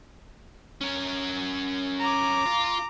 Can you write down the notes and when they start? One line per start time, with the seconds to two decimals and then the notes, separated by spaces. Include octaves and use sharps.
0.81 C#4 A#4
2.01 A#5 D6
2.46 F4